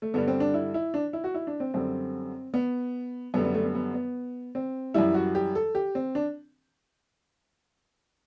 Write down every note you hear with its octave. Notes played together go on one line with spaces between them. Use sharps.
A3
G2 D3 G3 B3
C4
D4
E4
E4
D4
E4
F#4
E4
D4
C4
F#2 D3 G3 C4
B3
F#2 D3 G3 B3
B3
A3
B3
B3
B3
C4
F#2 E3 G3 E4
F#4
G4
A4
G4
C4
D4